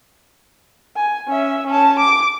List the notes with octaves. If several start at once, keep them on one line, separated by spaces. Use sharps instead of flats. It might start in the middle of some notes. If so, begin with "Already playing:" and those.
G#5
C#4 E5
C#4 A5
D6